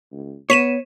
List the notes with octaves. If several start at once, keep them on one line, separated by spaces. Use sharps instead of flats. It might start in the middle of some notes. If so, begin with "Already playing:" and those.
C#2
B3 C#5 B6 D#7 E7